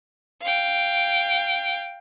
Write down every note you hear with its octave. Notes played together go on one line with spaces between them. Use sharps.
F5 G5